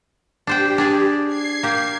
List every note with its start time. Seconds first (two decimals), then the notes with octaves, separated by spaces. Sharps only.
0.47 D4 G4 C5 G5
0.78 D4 G#4 D5
1.27 G#6 C7
1.63 A#3 G4